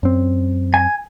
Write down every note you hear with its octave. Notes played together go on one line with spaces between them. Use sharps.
F#2 C4
G#5